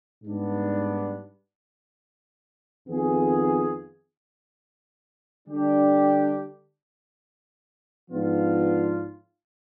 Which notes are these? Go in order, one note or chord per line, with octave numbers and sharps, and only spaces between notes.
G#2 G3 B3 D4
F2 D#3 B3 F4 G#4
D3 G3 D4 G4
G#2 F3 B3 D4 F4